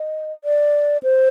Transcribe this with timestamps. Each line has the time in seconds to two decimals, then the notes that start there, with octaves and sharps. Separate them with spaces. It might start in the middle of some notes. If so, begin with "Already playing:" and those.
Already playing: D#5
0.44 D5
1.03 C5